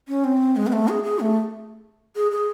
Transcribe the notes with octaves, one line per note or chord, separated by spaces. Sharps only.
C#4
C4
G#3
C4
A3
G#4
G#4
A3
G#4
G#4